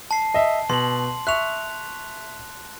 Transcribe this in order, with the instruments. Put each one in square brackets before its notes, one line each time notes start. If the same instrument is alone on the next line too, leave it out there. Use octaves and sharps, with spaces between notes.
[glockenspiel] A5 C7
[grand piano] D#5 E5
[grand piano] B2 [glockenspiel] C6 F#7
[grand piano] E5 C#6 [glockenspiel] F#6 F7